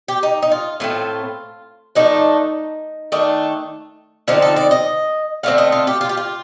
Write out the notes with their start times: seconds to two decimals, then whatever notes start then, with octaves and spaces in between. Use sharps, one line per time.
0.08 G4
0.23 D#4
0.42 D#4
0.52 F4
0.80 A2 F3 A3 C4 F4
1.95 F3 A3 D4 D#4
3.12 D#3 A3 D4
4.28 D3 F3 C4 D#4 F4
4.42 A4
4.56 D5
4.71 D#5
5.43 D3 A3 C4 F5
5.58 D#5
5.72 F4
5.87 G4
6.01 F4
6.09 G4
6.17 F4